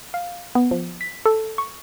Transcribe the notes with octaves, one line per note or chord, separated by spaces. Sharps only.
F5
B3
F3
B6
A4
C#6